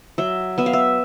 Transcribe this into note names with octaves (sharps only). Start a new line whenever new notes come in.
F#3 E5
B3 E5
F5
E5